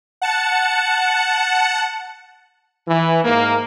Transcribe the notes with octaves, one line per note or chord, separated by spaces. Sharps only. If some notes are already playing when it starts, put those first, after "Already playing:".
F#5 A5 C#7
E3
G#2 A#3